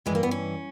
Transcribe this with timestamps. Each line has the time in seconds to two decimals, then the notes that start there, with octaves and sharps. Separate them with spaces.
0.06 G2 E3 G#3
0.15 A#3
0.23 B3
0.31 C#4